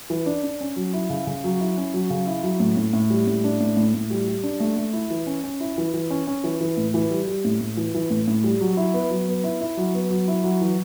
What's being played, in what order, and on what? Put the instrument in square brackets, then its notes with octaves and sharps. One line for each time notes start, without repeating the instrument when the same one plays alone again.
[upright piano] E3
D4
D4
C#4
F#3
E4
C#3
C#3
F#3
E4
C#4
F#3
C#3
E4
F#3
A2
A2
A2
G3
A2
D4
A2
A2
A2
G3
G3
D4
A3
A3
E4
E3
C#4
C#4
E4
E3
E3
C#4
C#4
E3
E3
A2
E3
G3
G3
A2
A2
E3
E3
A2
A2
G3
F#3
E4
B3
F#3
B3
E4
E4
F#3
B3
F#3
E4
F#3
E3